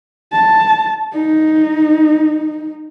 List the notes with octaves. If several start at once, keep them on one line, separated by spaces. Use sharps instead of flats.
A5
D#4